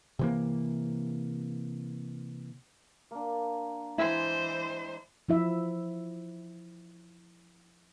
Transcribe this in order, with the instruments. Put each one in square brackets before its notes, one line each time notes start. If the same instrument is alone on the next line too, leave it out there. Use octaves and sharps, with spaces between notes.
[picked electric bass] C3 E3 A#3
[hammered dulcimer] A#3 D4
[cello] E3 C5 [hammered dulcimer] G#3 [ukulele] E4
[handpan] F3 E4 E5